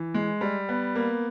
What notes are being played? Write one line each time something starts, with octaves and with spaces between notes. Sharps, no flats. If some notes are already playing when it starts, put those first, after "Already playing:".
Already playing: E3
G#3
G3
B3
A#3